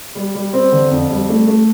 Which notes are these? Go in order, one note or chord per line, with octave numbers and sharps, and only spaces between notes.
G3
G3
C4
D3
F2
G3
A3
A3